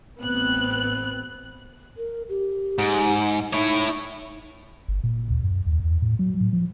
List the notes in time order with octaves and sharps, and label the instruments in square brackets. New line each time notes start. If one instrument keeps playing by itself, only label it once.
[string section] A1 B3 C4 F#6
[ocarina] A#4
G4
[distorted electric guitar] G#2
[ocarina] D#4 [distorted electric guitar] E4 C#5
[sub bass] G1
A#2
D2
F#2
D#2
E2
A2
F#3
A2
F3